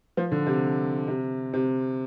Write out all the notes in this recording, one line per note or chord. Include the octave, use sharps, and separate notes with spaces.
F3
D3
C3
C3
C3